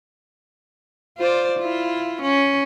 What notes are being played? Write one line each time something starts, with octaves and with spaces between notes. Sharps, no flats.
F4 C5 D5
E4 F4
C#4